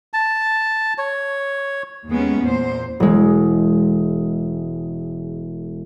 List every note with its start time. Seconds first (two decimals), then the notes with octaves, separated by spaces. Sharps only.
0.14 A5
0.98 C#5
2.09 D#2 G#3 B3 C#4
2.40 E2 A#2 C5
3.00 E1 G#3